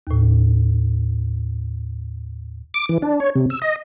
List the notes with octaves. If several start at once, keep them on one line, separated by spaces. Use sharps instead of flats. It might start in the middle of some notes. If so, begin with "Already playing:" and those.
D#2 A2
D6
E3
D4
C#5
C3
E6
D#5